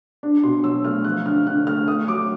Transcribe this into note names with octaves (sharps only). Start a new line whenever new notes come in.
D4
B2 C6
F#3 E6
A3 F6
F3 F#6
D3 F6
D3 F#6
A3 F6
A3 D#6
F#3 D6